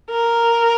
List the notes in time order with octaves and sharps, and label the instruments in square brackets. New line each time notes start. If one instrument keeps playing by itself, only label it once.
[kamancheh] A#4